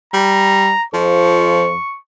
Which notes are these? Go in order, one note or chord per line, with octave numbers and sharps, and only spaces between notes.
G3 A#5
F2 F3 C#6